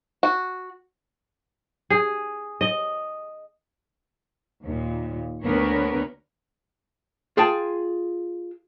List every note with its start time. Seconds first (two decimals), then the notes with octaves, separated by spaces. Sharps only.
0.23 F#4
1.90 G#4
2.61 D#5
4.62 D#2 A#2
5.43 D2 D3 B3 A#4 B4 C#5
7.37 F4 G#4 G5 A5